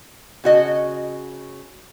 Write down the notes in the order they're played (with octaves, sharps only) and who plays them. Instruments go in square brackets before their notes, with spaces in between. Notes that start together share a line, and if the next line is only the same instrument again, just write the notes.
[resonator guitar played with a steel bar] C#3 F#4 D#5